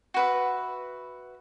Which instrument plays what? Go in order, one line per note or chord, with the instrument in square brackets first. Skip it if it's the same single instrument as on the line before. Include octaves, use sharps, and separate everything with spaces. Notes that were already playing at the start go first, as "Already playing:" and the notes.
[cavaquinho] F#4 B4 E5